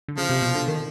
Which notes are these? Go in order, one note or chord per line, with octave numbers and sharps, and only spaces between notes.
D3
C#3 F3
C3
B2
D3
D#3